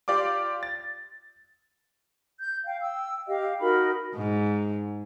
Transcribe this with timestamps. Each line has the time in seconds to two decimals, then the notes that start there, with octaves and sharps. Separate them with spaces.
0.08 F4 G4 D5 F5 D6
0.63 A6
2.39 G6
2.65 F5 G5
2.82 G5 E6
3.27 G4 D#5 F5
3.60 D#4 F#4 A#4 B5
4.15 G#2